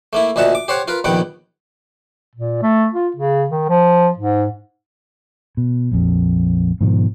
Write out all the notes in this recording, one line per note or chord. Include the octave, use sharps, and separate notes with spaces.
A3 A#3 E4
D2 A#2 D#5 E5 F#5 A5
D6
G4 C5 C#5 F#5
F4 A#4 B4
A#1 D#2 D#3 B3 F#5 G5
A#2
A3
F4
C#3
D#3
F3
G#2
B2
A#1 F2
G#2 B2 D#3 F3